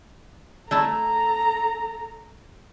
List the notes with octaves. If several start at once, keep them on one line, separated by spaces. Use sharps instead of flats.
A3 E4 A4 A5 A#5